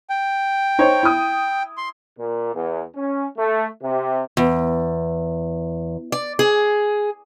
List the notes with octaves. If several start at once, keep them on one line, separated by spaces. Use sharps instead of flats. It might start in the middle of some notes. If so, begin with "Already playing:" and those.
G5
D#4 C5 C#5
E4 D#6
C6
A#2
E2
C#4
A3
C3
E2
D5
G#4